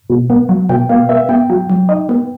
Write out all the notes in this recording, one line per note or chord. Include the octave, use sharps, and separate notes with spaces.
B2
B3
F#3
B2 G5
B2 F5
B3 E5
B3 G5
F#3
F#3
D#4
B3